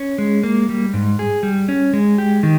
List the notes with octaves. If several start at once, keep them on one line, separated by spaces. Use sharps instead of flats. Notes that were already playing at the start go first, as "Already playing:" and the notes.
Already playing: C#4
G#3
A#3
G3
G#2
G#4
G3
C#4
G#3
G4
D#3